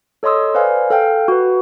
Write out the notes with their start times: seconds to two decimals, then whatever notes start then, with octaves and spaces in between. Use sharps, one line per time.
0.23 A4 C#5 D#5 C6 D#6 E6
0.55 B4 C5 D5 F5 G#5
0.90 A4 F5 G5
1.28 F#4 B4